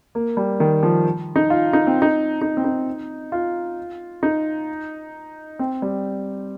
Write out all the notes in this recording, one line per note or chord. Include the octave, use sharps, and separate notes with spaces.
A#3
G3
D#3
F3
D#4
F4
D#4
C4
D#4
D#4
C4
D#4
F4
D#4
C4
G3